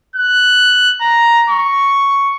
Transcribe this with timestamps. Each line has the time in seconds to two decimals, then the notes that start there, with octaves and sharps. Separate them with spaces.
0.16 F#6
1.01 A#5
1.50 C#6